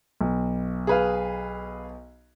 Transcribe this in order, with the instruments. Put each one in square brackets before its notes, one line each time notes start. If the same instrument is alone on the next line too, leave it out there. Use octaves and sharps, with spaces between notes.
[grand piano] B1
[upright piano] G#4 B4 F5